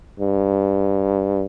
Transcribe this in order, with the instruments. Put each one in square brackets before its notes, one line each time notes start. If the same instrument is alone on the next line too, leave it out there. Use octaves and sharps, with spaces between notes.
[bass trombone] G2